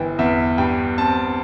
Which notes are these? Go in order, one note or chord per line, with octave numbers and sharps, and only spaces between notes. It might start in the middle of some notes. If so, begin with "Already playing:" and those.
Already playing: G1 E3 G5
E2 E5
G2 G5
C4 A5